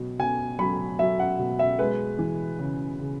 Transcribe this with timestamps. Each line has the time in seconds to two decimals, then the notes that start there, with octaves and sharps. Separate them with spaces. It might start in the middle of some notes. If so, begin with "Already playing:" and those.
Already playing: B2 F#3
0.19 B2 G#5
0.59 F#3 B5
0.99 F#3 E5
1.19 F#5
1.39 B2
1.59 E5
1.79 G#3 B4
2.19 E3
2.59 C#3
2.99 C#3